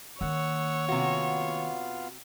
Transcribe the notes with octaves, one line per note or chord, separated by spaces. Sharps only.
D#3 A#3 C#5 F#5 E6
C3 B3 F4 F#4 F5